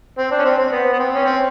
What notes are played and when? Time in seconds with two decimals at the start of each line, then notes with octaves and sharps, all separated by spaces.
0.18 C4
0.32 D4
0.39 C#4
0.45 C4
0.58 C4
0.72 B3
0.93 B3
0.99 C4
1.15 C#4
1.25 C4